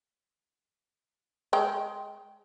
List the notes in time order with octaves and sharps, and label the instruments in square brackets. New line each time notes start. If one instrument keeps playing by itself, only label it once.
[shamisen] G#3 G5